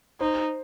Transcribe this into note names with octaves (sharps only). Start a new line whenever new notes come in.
D#4 C5